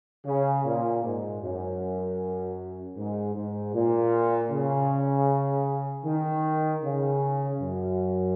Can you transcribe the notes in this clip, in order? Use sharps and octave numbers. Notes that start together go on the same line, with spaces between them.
C#3
A#2
G#2
F#2
G#2
G#2
A#2
C#3
D#3
C#3
F#2